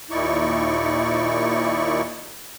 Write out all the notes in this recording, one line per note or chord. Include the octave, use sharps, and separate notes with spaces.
D#2 A#2 D#4 E4 D5 C#6